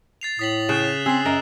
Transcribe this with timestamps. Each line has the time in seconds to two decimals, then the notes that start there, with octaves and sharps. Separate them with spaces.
0.21 A6 C7 F7
0.39 A2 D#6 B6 F#7
0.69 C#3 F#6 E7
1.06 C4 G#4 E6 C7
1.25 F#2 A#4 D#5